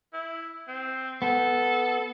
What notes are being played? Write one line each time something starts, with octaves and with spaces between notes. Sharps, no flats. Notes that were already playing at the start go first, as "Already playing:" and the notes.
E4
C4
B3 A4